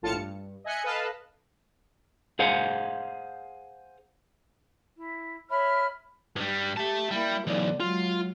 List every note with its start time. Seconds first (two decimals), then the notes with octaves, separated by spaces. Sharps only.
0.02 A#1 A2 F4 A5 F6 C#7
0.14 G2
0.64 D#5 E5 G#5 F#6 C#7
0.83 A4 B4 D#5 F5 A5
2.39 G#4 C5 F5 F#5
4.95 E4
5.49 C#5 E5 B5 F6
6.36 G2 G3
6.77 G4 E5 A5
7.11 G3 A#3 E4
7.47 B1 E2 D3 D5
7.80 F#3 G#3 F4